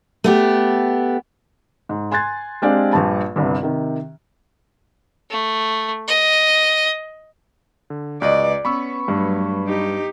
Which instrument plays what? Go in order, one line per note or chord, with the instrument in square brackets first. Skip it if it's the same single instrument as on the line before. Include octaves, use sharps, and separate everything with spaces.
[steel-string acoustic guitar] A3 B3 G4
[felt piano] G#2
G#5 C6 F#6 G#6 A6
G#3 C4 D4 G4 D5 F5
A#1 G2 A5
G1 C2 G2
C3 D#3
[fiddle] A3
D#5
[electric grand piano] D3
[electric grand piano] C#2 [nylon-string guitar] F#4 B4 D#5 [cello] D5
[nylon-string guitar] B3 [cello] C#4 [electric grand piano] B5 C#6 E6
[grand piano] G2 [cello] F#3 A3
[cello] D#4 G4